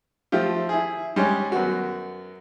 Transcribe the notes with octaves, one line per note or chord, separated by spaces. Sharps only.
F3 A3 F4 G4
E4 G#4
G3 G#3 C#4
F#2 B3 F#4